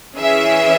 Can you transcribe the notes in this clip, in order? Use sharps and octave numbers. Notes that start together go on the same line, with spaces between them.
E3 C#4 G#4 E5